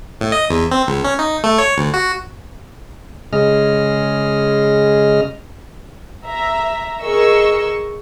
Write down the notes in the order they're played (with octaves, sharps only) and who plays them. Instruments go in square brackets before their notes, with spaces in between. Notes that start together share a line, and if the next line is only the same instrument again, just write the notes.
[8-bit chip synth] A2
D#5
E2
C4
C#2
C#4
D#4
A3
C#5
D2
F#4
[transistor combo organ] C#3 G#3 D#5 F6
[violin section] E5 A#5
G#4 A#4 D#5 C#6 E6